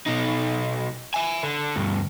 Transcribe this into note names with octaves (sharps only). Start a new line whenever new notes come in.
B2 D#4
E5 G#5
D3
D2 G2